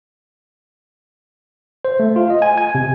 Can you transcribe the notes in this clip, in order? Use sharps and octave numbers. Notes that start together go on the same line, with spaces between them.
C5
A3
F4
D#5
G#5
G#5
C3